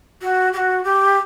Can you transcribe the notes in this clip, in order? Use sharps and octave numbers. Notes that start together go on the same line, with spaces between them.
F#4
G4
F#4
G4